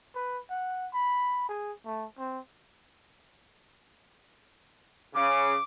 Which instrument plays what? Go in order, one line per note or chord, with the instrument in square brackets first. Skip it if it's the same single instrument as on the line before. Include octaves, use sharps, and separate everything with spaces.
[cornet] B4
F#5
B5
G#4
A3
C4
[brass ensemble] C#3 [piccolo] D6